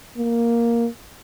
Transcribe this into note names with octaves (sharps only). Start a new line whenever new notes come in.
A#3